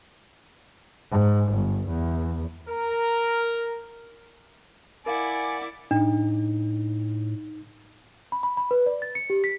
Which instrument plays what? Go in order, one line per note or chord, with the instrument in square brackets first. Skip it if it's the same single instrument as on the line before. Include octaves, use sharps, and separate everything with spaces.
[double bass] G#2
G1
E2
[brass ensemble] A#4
[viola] E4 D5 [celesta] A#4 F5 [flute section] F#5 B5 D6 [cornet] G#5
[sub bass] A2 [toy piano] D4 [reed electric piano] D#4
[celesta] B5
B5
B5
B4
D5
A6
C#7
G4
B6